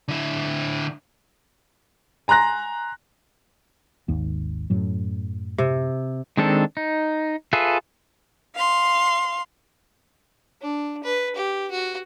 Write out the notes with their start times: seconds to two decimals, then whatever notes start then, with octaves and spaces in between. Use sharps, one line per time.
0.08 D3 E4
2.28 G#5 A#5 C6 F#6 A#6
4.08 G#1 D#2
4.70 F#2 A2 F#3
5.58 C3
6.37 D#3 G#3 C4 D4 A4
6.77 D#4
7.53 F4 G#4 A4 B4 E5
8.55 F5 C6
10.61 D4
11.04 B4
11.36 G4
11.71 F#4